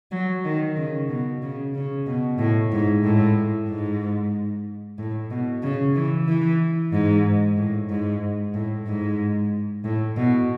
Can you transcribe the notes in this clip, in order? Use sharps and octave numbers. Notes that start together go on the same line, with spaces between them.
F#3
D#3
C#3
B2
C#3
C#3
B2
A2
G#2
A2
G#2
A2
B2
C#3
E3
E3
G#2
A2
G#2
A2
G#2
A2
B2